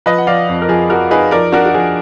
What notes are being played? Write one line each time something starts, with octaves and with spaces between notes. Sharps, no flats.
F3 B4 D#5
F#5
F3 D5 F5
F2
A#4
F3 G#4
F3 F#4 A#4
D#4 G#4 B4
F3 A#4 D5
D4 F#4 A#4
F#4
F3 G#4